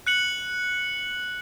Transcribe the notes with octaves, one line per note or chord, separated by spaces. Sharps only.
F#6 C#7 F#7